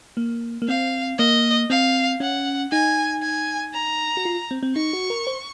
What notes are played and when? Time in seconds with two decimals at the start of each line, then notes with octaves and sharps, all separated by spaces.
0.17 A#3
0.62 A#3
0.68 C4 F5
1.18 A#3 D#5
1.70 C4 F5
2.20 C#4 F#5
2.71 D#4 G#5
3.22 G#5
3.74 A#5
4.17 F#4
4.25 F4
4.51 C4
4.63 C4
4.76 D#4 C#6
4.93 F#4
5.10 A#4
5.27 C5